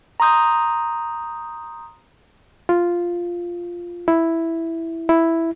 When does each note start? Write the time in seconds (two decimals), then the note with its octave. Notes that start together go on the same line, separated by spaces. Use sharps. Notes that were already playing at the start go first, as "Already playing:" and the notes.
0.20 A#5 C6 D#6 G6
2.69 F4
4.08 E4
5.09 E4